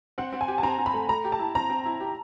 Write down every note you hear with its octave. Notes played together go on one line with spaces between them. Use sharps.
C4 F#5
C4
G#5
G4
A5
C4 A#5
C4
B5
A3
A3 A#5
G4
A5
E4
C4 A#5
C4
E4
G4